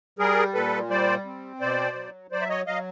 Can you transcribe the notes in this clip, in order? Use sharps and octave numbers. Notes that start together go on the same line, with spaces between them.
G3 G#4 A#4
A#2 A4 B4
G3 C5 D5
C4
B2 C5 D5
F#3
F#3 C5 D5
E5
C#5 D#5
F#3 D#5 F5